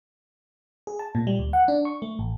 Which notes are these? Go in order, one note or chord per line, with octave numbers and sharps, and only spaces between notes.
G#4
A5
A#2
G3
D2
F#5
D4
C#6
A3
A1